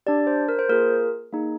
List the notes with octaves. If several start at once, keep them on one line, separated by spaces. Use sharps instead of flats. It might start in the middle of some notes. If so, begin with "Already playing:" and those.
D4 G4 D5
C5
A#4
C5
A#3 F4 G#4 A#4
A#3 D#4 G#4